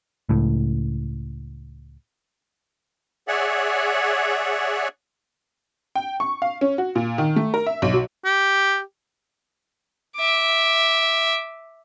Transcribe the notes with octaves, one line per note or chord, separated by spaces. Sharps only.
C#2 A2
G#4 C#5 D5 E5 F#5
G5
C#6
F5
C#4
F#4
A#2
D#3
A3
A#4
E5
B1
F#3
G4
E5 D6